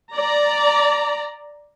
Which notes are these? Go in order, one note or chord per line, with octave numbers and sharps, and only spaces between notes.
D5 A#5